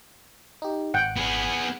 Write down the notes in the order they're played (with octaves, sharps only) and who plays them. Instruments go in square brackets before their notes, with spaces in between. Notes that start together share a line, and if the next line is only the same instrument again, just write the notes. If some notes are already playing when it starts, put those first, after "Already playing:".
[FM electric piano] D#4 G4
[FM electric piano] G#1 [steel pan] F#5 G5
[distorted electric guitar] B3 G#4